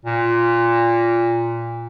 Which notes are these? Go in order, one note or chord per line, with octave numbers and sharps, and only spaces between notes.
A#2